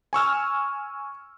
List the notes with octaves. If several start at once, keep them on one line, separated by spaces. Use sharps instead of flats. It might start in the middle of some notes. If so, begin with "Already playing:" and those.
G#5 C#6 E6 F6